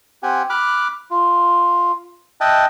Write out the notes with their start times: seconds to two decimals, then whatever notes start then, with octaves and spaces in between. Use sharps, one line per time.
0.23 C4 G4 F#5 G#5
0.50 B5 D6 F6 F#6
1.11 F4
2.41 D#5 E5 G5 A5 F#6